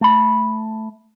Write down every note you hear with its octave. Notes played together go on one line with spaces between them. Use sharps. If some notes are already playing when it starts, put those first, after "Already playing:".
A3 B5